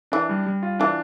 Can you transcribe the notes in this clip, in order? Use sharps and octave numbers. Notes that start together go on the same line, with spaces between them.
E3 D4
G3
G3
F4
E3 D4